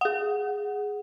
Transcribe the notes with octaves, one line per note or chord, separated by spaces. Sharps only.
G#4 F#5